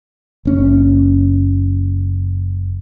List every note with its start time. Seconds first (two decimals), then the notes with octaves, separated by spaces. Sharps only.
0.45 F#1 C#4